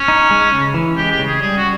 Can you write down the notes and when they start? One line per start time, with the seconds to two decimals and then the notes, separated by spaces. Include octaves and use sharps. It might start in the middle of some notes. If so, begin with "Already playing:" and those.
Already playing: C#4
0.08 D#4
0.31 G#3
0.52 C#3
0.74 E3
0.96 G#3 G4
1.11 G4
1.19 C#3
1.27 G#4
1.41 G3 G#4
1.57 F#4